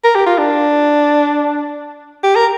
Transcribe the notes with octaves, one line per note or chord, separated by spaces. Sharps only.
A#4
G4
F4
D4
G4
A#4